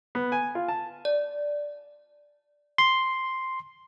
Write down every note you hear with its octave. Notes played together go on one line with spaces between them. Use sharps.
B3
G#5
F4
A5
D5
C6